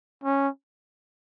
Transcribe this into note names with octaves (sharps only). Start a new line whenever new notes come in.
C#4